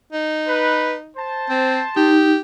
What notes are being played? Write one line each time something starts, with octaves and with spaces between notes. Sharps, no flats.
D#4
B4
C5 A5
C4
D#4 G4